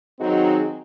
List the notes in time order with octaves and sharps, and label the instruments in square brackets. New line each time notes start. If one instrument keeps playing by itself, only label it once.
[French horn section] D#3 F#3 C4 D#4 F#4 G#4